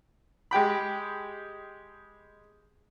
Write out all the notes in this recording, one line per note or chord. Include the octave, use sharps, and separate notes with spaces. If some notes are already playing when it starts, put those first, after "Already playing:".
G#3 G4 G5 B5